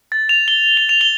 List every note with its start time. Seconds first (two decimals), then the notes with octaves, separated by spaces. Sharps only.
0.12 A6
0.29 F7
0.48 G7
0.77 G7
0.89 F7
1.01 G7